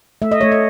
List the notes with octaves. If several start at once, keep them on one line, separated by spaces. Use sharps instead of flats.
A3 E5
D#5
A3 C#5
D#5